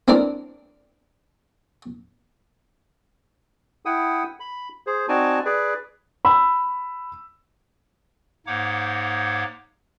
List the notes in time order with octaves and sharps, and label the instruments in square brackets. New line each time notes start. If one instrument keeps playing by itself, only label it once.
[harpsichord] C4 D4 E4 A#4 D5
[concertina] E4 F#5 G5 D#6
B5
G#4 C5
C4 D#4 F#4 D5 G#5 A5
G#4 B4 D5
[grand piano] B5 E6
[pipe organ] G#2 A#3 D#4 C#5 F#5 D6